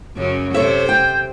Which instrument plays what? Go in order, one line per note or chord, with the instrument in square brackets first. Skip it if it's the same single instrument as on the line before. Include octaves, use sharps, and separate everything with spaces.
[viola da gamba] F#2 C#3 F#3
[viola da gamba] C3 C5 [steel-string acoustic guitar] A4 C#5 E5
[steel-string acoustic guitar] G5 [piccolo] G6